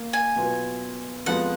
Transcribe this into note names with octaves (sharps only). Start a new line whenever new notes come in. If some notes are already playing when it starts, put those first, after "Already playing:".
Already playing: A#3
G#5
B2 F#3 B3 F4 B4
F2 F3 G#3 B3 F4 F#5